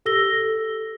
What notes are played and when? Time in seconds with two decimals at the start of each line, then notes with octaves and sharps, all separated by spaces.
0.06 G4 A4 E6 A#6 G7